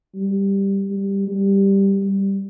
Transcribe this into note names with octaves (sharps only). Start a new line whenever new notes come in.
G3
G3
G3
G3